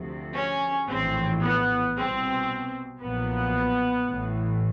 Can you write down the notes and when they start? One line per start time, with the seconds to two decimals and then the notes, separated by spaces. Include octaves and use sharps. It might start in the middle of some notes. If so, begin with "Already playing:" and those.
Already playing: D2 C3 F3
0.36 C#4
0.89 A#1 A2 E3 C4
1.42 B3
1.94 C2 B2 C4
3.00 B1 A#2 F3 B3
4.06 A1 A2 E3